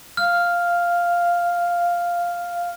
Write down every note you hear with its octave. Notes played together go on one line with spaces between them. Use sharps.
F5 F6